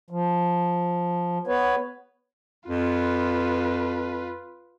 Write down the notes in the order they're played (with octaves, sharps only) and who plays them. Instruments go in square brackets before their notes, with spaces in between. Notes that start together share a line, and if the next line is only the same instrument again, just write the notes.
[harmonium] F3
B3 B4 C#5
[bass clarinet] F2 [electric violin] F4 B4